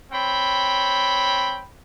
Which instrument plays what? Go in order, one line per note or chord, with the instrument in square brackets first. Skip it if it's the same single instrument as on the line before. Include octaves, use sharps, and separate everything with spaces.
[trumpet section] C4 C#5 G5 B5